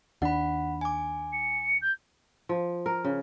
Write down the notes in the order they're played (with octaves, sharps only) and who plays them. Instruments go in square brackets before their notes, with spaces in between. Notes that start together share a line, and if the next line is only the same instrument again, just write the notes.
[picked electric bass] D#2 D4 [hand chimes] F#5 B5
[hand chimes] G#5 D6
[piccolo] C#7
G6
[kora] F3
A#4
C#3